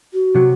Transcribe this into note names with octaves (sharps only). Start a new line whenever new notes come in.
F#4
C3 F#3